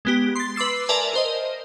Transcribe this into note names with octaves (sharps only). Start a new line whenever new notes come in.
G#3 B3 G4
C6 A6
B4 C6 D6 E6 C7
A#4 B4 D5 E5 G#5 A5
A#4 C5 D#5